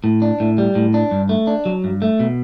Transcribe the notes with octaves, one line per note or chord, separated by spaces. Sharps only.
A2
D4
A2
G3
A2
D4
G2
A3
D4
F#3
G2
A3
B2